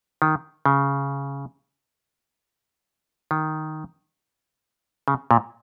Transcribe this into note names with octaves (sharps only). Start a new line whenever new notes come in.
D#3
C#3
D#3
C#3
A#2